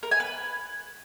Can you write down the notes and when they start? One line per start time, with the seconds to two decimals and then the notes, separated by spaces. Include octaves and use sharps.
0.03 A#4
0.11 G#5
0.20 B4